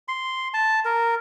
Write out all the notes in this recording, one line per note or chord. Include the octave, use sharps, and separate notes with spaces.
C6
A5
A#4